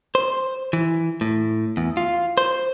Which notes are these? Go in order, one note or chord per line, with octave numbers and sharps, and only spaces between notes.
C5
E3
A2
E2
F4
C5